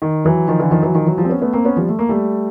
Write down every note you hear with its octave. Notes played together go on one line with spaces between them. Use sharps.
D#3
E3 F#3
D#3 F3
D3 E3
D#3 F3
E3 F#3
D#3 F3
E3 F#3
F3 G3
C4
B3 C#4
A3 B3
A#3 C4
B3 C#4
F3 G3
A3
A#3
G3 A3